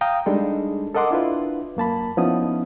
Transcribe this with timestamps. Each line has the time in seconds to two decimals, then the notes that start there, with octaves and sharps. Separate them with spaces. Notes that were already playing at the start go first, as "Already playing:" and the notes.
0.01 F5 G5 A#5 D#6
0.26 G3 G#3 D4 D#4 G#4 A4
0.95 A4 A#4 D#5 F#5 C6 D6
1.11 D4 E4 F4 B4
1.77 F#2 A#3 A5 B5
2.17 F3 B3 C#4 D#4 E4 D#6